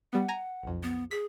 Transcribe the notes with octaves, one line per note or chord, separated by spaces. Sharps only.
G3 B3 F#5
G#5 A#5
B1 F2
B3
G#4 B6